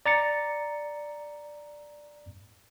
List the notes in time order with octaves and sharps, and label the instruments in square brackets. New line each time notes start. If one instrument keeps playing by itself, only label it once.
[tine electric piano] D5 A#5 A6 C#7